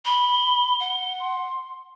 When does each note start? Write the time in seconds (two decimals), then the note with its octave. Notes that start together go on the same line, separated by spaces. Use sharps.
0.05 B5 G7
0.80 F#5
1.20 C6